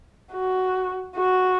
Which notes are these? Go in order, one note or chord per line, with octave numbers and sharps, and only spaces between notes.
F#4
F#4